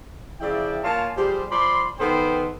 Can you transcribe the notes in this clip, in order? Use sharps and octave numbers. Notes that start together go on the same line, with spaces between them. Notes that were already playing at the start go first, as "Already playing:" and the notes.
C#3 F3 E4 D5 E5 G5
A#3 F4 C#5 G#5 A5
F3 G3 G4 G#4 C5 D5
F3 D5 B5 C6
D#3 B3 A4 B4 C5 G5